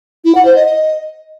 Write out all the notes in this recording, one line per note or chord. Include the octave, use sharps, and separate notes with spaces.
E4
F#5
C5
D#5
D#5